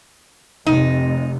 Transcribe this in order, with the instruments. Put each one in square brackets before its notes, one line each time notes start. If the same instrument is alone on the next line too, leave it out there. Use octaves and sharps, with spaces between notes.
[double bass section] F1 C3 [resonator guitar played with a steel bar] D#4